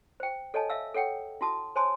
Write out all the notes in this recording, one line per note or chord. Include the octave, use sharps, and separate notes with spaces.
C5 G5
A4 C#5 D#5 G#5 A5
E5 F5 E6
A4 C#5 F#5 G5
E4 F#4 A5 D#6
C5 C#5 G#5 A5 C6 D#6